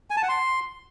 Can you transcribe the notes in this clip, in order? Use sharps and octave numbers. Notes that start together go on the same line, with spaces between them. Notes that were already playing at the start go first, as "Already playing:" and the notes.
G#5
A5
F#5
C6